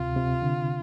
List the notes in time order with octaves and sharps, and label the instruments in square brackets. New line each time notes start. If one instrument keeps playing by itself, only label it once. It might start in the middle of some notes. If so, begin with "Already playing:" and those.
Already playing: [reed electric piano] D2 C3 [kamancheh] F4
[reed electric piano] C3
D3